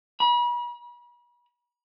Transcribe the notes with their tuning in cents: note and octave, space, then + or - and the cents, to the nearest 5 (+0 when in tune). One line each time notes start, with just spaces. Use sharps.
B5 -40